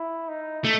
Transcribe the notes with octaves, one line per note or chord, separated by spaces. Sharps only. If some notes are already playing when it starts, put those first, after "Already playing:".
Already playing: E4
D#4
A3